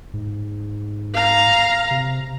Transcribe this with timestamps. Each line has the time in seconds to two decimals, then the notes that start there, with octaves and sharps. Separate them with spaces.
0.13 G#2
1.14 F5 A#5
1.91 C3